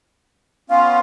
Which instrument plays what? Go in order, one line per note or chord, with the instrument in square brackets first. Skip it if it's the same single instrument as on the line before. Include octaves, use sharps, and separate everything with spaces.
[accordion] B3 C#4 F4 [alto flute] F5